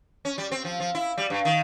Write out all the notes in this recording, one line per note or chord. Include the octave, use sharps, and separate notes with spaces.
C#4
G3
C4
F3
F3
E4
G3
G2
D#3